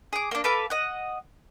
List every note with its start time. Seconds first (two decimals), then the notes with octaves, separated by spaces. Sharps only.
0.13 G#4 D6
0.31 A#3 D4
0.44 A4 B4 F5 D6
0.70 D#5 F#5